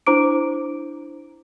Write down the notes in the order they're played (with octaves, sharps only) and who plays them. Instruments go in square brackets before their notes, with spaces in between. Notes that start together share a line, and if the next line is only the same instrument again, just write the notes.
[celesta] D4 E4 C5 A#5 D6 D7